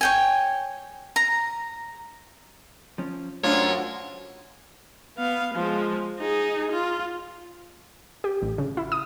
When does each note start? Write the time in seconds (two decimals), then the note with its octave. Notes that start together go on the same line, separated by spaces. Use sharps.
0.01 C#5 G5 G#5
1.16 A#5
2.98 F3 C#4
3.44 F#2 A3 D4 F4 C5 C#5
3.70 F#4
5.18 B3 F5
5.54 F3 G#3
6.20 D#4 G#4
6.71 F4
8.24 G4
8.42 A1
8.58 C#3
8.77 E4
8.92 D#6